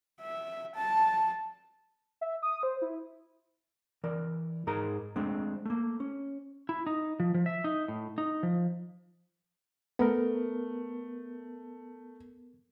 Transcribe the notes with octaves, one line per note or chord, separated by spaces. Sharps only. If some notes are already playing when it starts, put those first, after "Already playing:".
E5
A5
E5
D#6
C5
E4
E3 A#4 D5
G#2 D#4 G#4 A#4 A#5
G#3 A3 C4 D4
A3 A#3
C#4
E4
D#4
F3
F3
E5
D#4
A2
D#4
F3
A3 B3 A#4